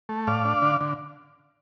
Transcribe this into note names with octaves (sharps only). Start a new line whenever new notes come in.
A3
A2 D5 F5
D4
D3
D3